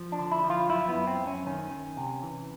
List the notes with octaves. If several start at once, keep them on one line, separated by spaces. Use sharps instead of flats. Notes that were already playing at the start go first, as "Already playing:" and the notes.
Already playing: F3
D4
D3
E4
F3
F4
F#2 E4
B3
F#2
C4
F#2
C#4
D#3 C#4
D#3
C3
E3